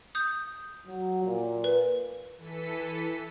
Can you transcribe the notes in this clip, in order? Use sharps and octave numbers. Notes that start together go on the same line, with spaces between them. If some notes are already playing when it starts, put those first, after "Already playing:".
D#6 G6
F#3
A#2
B4
E3 A4 B6 C#7 D#7